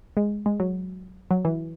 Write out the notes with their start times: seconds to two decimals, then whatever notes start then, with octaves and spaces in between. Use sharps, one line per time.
0.17 G#3
0.46 G#3
0.60 F#3
1.31 F#3
1.45 E3